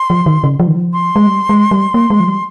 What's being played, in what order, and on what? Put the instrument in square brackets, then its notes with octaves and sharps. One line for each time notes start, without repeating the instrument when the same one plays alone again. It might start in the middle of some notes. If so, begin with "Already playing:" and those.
Already playing: [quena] C6
[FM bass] F3
D#3
C#3
F3
D#3
F3
[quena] C6
[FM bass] G#3
G3
G#3
G3
A#3
G#3
F3
G3